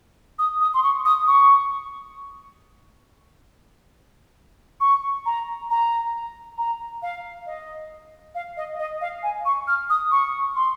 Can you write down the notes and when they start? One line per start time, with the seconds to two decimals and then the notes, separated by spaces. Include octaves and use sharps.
0.39 D#6
0.61 D#6
0.74 C6
0.83 C#6
1.05 D#6
1.27 C#6
4.81 C#6
5.26 A#5
5.70 A#5
6.58 A#5
7.02 F5
7.46 D#5
8.35 F5
8.57 D#5
8.79 D#5
9.01 F5
9.23 G#5
9.45 C#6
9.68 F6
9.90 D#6
10.11 C#6
10.56 C6